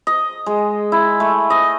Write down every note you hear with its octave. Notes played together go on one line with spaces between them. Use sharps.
D#5
G#3
E4
A3
D#5